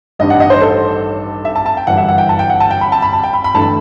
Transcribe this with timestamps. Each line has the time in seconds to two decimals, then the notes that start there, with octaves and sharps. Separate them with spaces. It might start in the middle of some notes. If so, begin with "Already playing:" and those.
0.19 A1 G2 D#3 G3 D#5
0.30 F#5
0.40 D#5
0.50 C5
0.61 A4
1.45 E5
1.56 A5
1.66 A5
1.77 G5
1.87 G1 F#2 E3 G3 F#5
1.97 E5
2.08 F#5
2.18 G5
2.29 A5
2.39 G5
2.50 F#5
2.60 A5
2.71 G5
2.81 B5
2.92 A5
3.02 B5
3.13 A5
3.24 G5
3.33 B5
3.44 B5
3.54 G1 G2 E3 A3 A5
3.62 B5